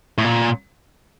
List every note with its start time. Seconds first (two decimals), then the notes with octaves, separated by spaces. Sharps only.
0.18 A2
0.24 A#2